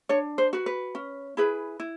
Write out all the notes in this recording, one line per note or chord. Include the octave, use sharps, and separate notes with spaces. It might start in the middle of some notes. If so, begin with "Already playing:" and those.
D4 C#5
C5
F#4 B4
B4
C#4
E4 G#4 B4
E4